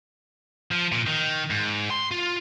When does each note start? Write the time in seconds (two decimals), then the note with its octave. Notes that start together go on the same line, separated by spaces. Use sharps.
0.71 F3
0.92 A#2
1.07 D#3
1.50 G#2
1.90 C6
2.11 F4